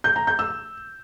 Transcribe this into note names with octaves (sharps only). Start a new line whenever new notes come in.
G6
A#5
G6
E6